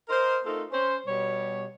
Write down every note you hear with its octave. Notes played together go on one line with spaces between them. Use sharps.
A#4 C5 D#5
A3 C4 D#4 F4 A4 A#4
C#4 C5
B2 G3 C#5